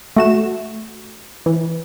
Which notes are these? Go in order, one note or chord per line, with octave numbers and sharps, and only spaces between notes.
A3 F#4 E7
E3